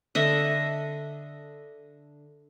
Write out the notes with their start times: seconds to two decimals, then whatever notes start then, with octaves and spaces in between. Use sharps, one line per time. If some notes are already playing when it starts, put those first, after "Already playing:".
0.15 D3 D#5 E5